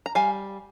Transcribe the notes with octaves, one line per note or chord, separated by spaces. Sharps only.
A#5
G3 F5 G#5